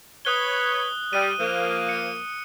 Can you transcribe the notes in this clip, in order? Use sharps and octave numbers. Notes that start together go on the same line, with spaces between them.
B4 C#5 D#6 F#6 G7
G3 D#7
F3 A#3
C#7